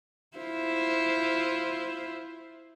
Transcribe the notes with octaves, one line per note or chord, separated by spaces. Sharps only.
E4 F4 C5